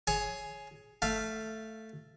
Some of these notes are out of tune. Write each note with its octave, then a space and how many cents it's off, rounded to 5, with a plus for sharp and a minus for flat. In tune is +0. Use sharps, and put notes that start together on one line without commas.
G#4 +10 C#5 +0
A3 +0 F5 -15